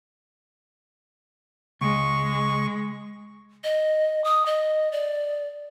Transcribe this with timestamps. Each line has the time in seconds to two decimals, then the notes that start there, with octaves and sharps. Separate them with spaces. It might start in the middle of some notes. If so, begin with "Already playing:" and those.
1.81 C#2 G#3 C#6
3.64 D#5
4.24 D#6
4.46 D#5
4.92 D5